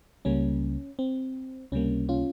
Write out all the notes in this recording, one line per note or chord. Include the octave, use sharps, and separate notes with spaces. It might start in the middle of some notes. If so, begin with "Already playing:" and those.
C#2 C#3 G3 A#3 C#4
C4
C#2 C3 G3 A#3 C#4
C#4 F4